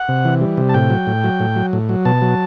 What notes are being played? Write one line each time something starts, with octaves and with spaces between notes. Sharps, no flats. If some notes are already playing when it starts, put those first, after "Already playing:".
Already playing: F#5
C3
E3
G3
C3
A5
A2 G5
F#3
A2
F#3
A2
F#3
A2
F#3
B2 A5
F#3